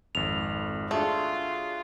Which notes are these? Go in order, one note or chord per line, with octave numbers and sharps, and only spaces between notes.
G#1 F2 F7
A3 D4 F4 F#4 G#4